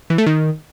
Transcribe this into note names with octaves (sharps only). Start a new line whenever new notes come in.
E3
A3
D#3